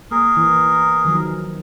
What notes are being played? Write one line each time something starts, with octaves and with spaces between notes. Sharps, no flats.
A#3 G#4 A#4
E3
D#3 F3 F#3